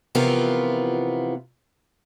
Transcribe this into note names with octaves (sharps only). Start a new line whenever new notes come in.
C3 E3 F3 B3 F4 A#4